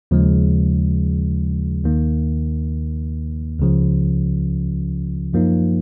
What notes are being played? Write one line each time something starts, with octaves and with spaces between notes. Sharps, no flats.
D#2 C#3 F3 G#3
D#2 D#3 A#3
C#2 C#3 F3
F#2 F3 A#3 D#4